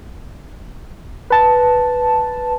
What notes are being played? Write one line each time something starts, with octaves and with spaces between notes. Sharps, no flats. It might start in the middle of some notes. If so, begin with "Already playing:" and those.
B4 A5